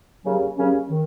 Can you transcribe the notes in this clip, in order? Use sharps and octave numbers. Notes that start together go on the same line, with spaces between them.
D#2 C#3 F#3 C#4
D#2 C#3 F#3 C#4
D#3